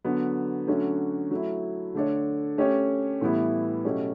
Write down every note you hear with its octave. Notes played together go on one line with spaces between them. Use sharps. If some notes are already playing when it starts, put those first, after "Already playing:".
D3 F#3 B3
D3 F#3 A3 C#4 F#4
F#3 A3 E4
D3 A3 D4 A4 C#5
A3 C#4 G4 C#5
A2 E3 G3 B3 E4
B2 F#3 A3 C#4 G4